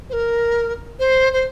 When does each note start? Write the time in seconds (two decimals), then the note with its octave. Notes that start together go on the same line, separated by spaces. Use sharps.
0.10 C5
0.13 A#4
0.99 C5
1.33 C5